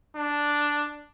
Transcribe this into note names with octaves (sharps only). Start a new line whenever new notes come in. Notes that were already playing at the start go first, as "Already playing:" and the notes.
D4